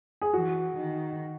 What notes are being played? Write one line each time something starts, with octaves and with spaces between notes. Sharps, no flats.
G#4
E3 F#4
D#3